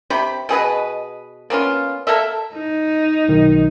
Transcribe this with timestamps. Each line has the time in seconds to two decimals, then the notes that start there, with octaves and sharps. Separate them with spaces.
0.10 C3 G4 B5
0.49 B2 G#4 B4 D#5
1.50 A#3 B3 C#4 F4
2.07 A#3 A4 A#4 E5
2.54 D#4
3.28 B1 D#3